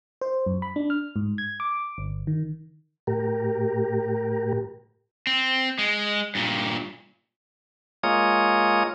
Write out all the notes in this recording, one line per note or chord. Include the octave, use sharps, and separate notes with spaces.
C5
F#2
B5
D4
F6
G#2
G#6
D6
G1
D#3
A2 G4 A#4
C4
G#3
G2 A#2
G#3 A#3 F4 C#5 D#6